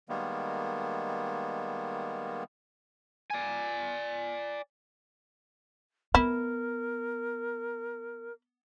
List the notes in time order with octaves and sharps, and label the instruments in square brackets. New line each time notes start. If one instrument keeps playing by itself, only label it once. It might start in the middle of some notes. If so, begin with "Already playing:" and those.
[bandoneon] D#3 G3 G#3 A#3 B3
[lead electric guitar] D5 G#5
[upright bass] B3 [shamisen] E4 [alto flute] A#4